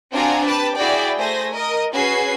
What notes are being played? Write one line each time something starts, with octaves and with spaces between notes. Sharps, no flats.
C4 D4 F4 F#4 G#5 A#5
G4 B4 A5 D6
E4 F#4 G#4 D5 G5
A3 G#4 C5 G#5 A#6
A#4 D#5
C#4 F#4 G#4 B4 G#6 C7